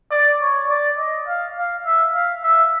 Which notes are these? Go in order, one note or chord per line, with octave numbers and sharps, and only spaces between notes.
D5
C#5
D5
D#5
F5
F5
E5
F5
E5